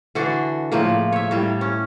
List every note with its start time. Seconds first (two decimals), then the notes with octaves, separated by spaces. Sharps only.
0.15 D3 E3 D4 F#4
0.72 A2 C#3 F3 A#3
1.12 C#5 E5
1.31 A2 G3
1.61 C#4